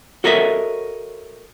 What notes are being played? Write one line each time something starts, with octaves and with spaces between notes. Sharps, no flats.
F#4 A4 A#4 C#5 D#5 E5